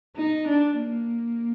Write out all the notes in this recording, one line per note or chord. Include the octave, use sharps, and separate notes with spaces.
D#4
D4
A#3